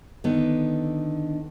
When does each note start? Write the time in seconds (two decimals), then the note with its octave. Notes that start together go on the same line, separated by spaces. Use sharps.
0.24 D3 D#3 B3